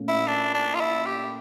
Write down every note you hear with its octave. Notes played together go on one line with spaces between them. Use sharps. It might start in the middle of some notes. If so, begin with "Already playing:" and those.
Already playing: A#2 A3 C#4
E4
D4
D4
F4
E4
G4